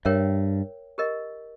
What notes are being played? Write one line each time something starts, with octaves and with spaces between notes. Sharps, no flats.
G2 A#4 C#5 E5 G5
G4 A#4 D#5